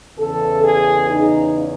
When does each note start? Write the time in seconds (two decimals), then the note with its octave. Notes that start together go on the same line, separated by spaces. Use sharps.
0.18 E2 C#3 E3 A4
0.63 G#4
1.10 D#4